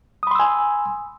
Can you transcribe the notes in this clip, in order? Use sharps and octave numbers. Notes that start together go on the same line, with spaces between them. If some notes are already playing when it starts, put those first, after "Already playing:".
G#5 B5 C6 D#6 E6